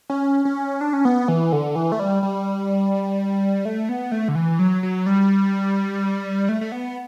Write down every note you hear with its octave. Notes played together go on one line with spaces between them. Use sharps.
C#4
C#4
D4
C#4
B3
E3
D3
E3
A3
G3
G3
A3
B3
A3
D3
E3
F#3
F#3
G3
A3
A3
B3